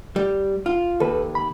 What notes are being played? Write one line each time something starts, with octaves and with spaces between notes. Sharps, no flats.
G3
F4
D#2 A4 B4
B5